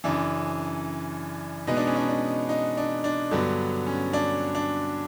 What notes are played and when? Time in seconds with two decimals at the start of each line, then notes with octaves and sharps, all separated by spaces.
0.04 F#2 C#3 E3 D4
1.67 B2 G#3 B3 D#4
1.77 D4
1.87 C#4
1.96 D4
2.08 D4
2.49 D#4
2.77 D4
3.04 D4
3.31 G2 D3 F#3 B3 D4
3.86 C#4
4.13 D4
4.55 D4